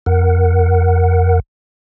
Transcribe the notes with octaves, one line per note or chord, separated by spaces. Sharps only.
F2 A#4 F#5